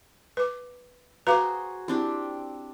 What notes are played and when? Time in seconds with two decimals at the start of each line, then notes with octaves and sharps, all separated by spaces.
0.37 B4 D6
1.27 F#4 G#4 B4 C5 F5 A#5 D6
1.88 C4 D4 E4 G4